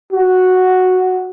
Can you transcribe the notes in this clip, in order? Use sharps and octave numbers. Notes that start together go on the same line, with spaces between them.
F#4